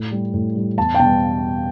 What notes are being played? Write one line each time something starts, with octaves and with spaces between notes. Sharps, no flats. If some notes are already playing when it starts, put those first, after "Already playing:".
Already playing: A2
G3
A2
G3
E2 A5
G5
B2 G3 A5